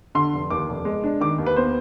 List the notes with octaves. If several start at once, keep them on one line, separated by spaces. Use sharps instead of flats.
D3 C6
F1
D#2 D6
F1
G#3
D4
D#3 D6
D#2
B4
B3 C5